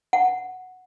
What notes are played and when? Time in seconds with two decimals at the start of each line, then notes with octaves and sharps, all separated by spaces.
0.13 F#5